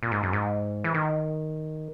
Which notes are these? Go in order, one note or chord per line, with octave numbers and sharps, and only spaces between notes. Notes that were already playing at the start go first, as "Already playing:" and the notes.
A#2
G#2
F#2
G#2
E3
D#3